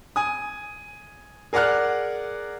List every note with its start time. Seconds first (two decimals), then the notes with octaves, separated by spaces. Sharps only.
0.16 G#5 D#6
1.53 G#4 A#4 D5 F#5 F6 F#6